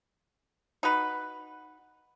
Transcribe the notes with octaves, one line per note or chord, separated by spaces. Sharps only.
D#4 F#4 B4